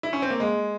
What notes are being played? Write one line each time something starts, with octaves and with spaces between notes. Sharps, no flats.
E4
C#4
C4
A#3
G#3